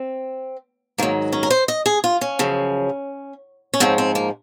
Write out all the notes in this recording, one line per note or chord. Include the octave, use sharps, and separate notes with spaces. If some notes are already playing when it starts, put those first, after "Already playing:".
Already playing: C4
G#2 D#3 F#3 A#3
C#4
A#4
C5
D#5
G#4
F4
C#4
F#2 C#3 F3
C#4
G#2 F3 C4
C4
A#3